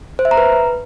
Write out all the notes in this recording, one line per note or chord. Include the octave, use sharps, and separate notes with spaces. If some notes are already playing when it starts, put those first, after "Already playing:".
C5
E5
A#5
B4